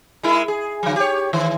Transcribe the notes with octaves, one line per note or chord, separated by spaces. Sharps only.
G#3 E4 A#4
G#4
D3 F#3
G4 C#5
G#2 D#3 E3